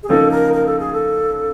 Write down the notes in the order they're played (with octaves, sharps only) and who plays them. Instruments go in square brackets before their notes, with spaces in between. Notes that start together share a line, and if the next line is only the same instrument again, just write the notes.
[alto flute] G#4
[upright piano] C#3 F3 A#3 D#4 [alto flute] A4
[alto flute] A#4
A#4
A4
G#4
A4